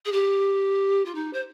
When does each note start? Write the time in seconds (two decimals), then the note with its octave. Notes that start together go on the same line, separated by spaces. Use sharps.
0.05 G#4
0.12 G4
1.05 F4
1.14 D#4
1.33 C5